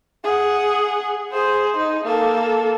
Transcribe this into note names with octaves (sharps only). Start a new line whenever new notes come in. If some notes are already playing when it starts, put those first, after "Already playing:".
G#4 F#5
G#4 C5
D#4
A#3 A4